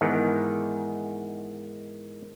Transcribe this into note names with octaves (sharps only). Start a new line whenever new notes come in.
G#2 D#3 E3 B3